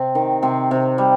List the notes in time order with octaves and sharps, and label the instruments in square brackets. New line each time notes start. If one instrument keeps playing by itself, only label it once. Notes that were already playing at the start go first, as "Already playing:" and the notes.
Already playing: [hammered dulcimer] C3 C4
D#3
C3 C4
C3
G3